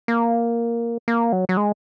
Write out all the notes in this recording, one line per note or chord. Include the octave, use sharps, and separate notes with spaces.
A#3
A#3
F#3
F#3
G#3